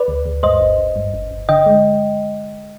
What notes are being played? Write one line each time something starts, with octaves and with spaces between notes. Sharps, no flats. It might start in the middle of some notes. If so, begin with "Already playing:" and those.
Already playing: B4 D5
D2
D2
G2 C5 D#5
G1
G1
G2
G1
G1
D3 D#5 G5
G#3